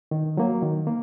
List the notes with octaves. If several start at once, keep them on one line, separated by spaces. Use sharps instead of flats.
D#3
F#3 A#3
D#3
A#3